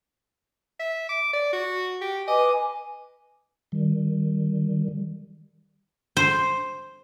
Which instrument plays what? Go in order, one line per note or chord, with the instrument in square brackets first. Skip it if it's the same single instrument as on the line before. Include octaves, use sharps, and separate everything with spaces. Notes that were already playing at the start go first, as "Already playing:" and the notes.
[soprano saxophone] E5
D6
D5
F#4
G4
[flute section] B4 G#5 D6 [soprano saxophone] D#5
[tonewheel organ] D#3 G3
[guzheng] C5